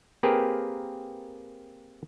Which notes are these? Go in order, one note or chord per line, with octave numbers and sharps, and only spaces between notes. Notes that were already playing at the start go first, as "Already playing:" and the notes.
A#3 C4 G4 G#4 A#4 B4